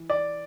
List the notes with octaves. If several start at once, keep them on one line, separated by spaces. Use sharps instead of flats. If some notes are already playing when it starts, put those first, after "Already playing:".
Already playing: E3
D5